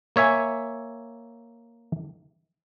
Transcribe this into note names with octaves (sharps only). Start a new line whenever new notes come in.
A#3 C#5 E5 G#5